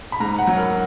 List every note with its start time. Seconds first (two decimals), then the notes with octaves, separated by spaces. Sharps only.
0.12 B5
0.20 G#2 A#5
0.39 F#5
0.47 F#3
0.57 A#4